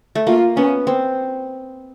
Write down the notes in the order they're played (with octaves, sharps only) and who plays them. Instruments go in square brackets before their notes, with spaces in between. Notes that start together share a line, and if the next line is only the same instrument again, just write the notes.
[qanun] A3
[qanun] A#3 [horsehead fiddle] F4
[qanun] B3 [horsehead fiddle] C#4
[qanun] C4